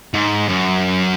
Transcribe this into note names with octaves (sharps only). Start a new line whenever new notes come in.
G#2
F#2